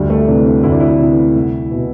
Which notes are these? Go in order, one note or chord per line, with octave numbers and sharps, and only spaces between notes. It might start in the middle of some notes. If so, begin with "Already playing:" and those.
Already playing: D2 G3
A3
C3 E3 D4
D4
D2 E4
D4
E4
C3 E3
C2
B2